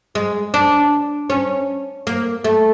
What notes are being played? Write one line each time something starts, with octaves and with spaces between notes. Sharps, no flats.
G#3
D4
C#4
A#3
A3